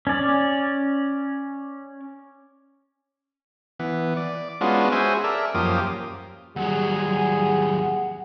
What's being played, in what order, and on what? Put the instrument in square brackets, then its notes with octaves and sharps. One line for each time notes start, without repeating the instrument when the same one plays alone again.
[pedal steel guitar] C#4 D5
[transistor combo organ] E3 B3
D5
G#3 B3 C#4 D4 F4 F#4
F#4 G#4 C5 E5 G#5
A4 A#4 D5 E5
F#2 F3 A#3 G4 D#6
[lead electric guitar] D#2 F#3 [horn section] G3 G#4 [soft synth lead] F#5